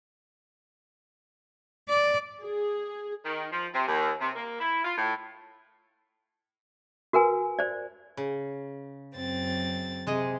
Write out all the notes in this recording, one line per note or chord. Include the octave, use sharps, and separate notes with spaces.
D5
G#4
D#3
F3
C3
D#2
C3
A#3
E4
F4
A2
F#4 A#4 B4 G#5
C5 D5
C#3
F#2 C4 A6
C3 G#3 G#4 D#5